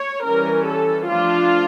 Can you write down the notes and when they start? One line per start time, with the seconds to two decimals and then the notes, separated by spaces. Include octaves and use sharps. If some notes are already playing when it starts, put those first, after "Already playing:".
Already playing: C#5
0.24 E3 G3 C#4 A#4
0.67 A4
1.09 F3 A3 D4 F4